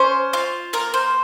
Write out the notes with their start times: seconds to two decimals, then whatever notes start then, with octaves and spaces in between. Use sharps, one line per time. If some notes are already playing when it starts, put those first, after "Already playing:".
Already playing: C#4 C5
0.33 F4
0.73 A#3 A#4
0.94 C5